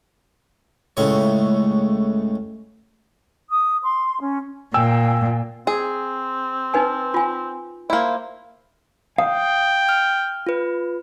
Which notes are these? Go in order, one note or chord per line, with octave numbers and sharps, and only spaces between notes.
C#2 A2 C#5
D#6
C6
C#4
A#2 G5 G#5 E6
C4 G#4
D#4 B4 G#5
F4 G#5
A#3 E4 C5
F5 G5 D#6
F6
F4 B4